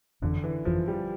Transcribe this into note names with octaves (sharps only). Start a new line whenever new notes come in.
G1 F2 D3 E3
E3
G1 F2 E3 F3
G3